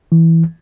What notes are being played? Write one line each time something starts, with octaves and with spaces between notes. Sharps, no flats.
E3